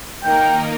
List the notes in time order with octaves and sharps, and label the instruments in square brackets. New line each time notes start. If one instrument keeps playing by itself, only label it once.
[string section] D#3 A#3 D#4 A#4 [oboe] G5